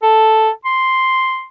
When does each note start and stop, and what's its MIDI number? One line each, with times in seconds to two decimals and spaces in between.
0.03 0.50 69
0.65 1.45 84